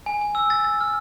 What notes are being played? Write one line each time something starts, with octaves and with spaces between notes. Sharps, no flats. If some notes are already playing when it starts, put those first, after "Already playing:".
G#5
G#5
E6
A6
A6
F6